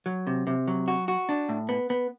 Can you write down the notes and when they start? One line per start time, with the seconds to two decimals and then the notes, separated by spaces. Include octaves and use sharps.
0.06 F#3
0.27 C3
0.47 C3
0.68 F#3
0.88 F#4
1.08 F#4
1.29 D4
1.49 A2
1.69 B3
1.90 B3